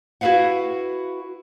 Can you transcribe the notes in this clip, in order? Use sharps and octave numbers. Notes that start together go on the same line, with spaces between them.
E4 F#4 A4 B4 F5 F#5